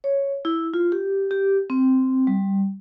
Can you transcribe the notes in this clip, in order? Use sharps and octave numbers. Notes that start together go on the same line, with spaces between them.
C#5
E4
F4
G4
G4
C4
G3